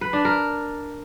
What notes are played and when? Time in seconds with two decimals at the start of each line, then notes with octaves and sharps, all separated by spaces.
0.01 B4
0.13 D4
0.25 A#4